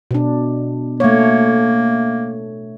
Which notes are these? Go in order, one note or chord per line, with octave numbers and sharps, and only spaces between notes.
B2 D4
A3 A#3 C#5